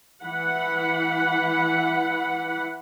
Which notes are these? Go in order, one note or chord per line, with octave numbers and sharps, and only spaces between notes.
E3 F#5 B5